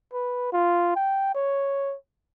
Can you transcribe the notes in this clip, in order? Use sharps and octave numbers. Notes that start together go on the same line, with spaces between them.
B4
F4
G5
C#5